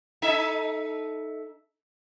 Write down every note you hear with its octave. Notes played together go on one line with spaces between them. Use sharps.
D#4 A4 E5